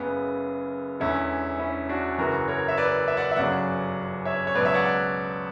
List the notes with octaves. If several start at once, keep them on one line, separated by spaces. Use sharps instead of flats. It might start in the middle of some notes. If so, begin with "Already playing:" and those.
Already playing: F#1 F#2 C#3 B3
E1 E2 D3 C#4 E4
C#4 E4
D4 F#4
F#1 F#2 E3 F#4 A#4
A#4 C#5
E5
B4 D5
E5
D5 F#5
E5
G1 F#2 C#3 F#3 D5 F#5
C#5 E5
C#5
C#2 B2 F#3 B4 D5
C#5 E5
D5 F#5
D5 F#5